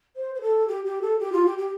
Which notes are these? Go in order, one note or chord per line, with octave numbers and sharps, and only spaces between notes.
C5
C5
A4
G4
G4
A4
G4
F4
G4
G4